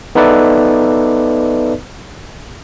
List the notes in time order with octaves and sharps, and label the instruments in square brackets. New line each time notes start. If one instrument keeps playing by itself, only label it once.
[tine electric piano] B3 D#4 A4 B4 D5 E5